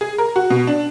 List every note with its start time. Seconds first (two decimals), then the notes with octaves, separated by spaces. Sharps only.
0.01 G#4
0.18 A#4
0.36 F#4
0.50 B2
0.67 D4